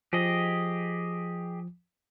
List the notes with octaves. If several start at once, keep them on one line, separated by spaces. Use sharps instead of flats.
F3 G4 G#4 D#5